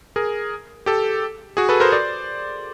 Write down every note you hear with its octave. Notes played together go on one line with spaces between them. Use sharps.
G#4 A#4
G4 A4
F#4 G#4
A4 B4
A#4 C5
C5 D5